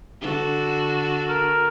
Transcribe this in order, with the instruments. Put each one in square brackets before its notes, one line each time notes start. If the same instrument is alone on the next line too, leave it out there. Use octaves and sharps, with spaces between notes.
[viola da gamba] D3 F#4 A4
[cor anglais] A#4